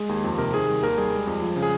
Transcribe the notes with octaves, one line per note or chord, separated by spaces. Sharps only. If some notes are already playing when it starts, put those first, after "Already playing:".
Already playing: G#3 G#4
D#2
F2
C3 A#4
D#3 G#4
G3
D#2 A#4
G3 G#4
G#3
F2
F3
C#3
G#4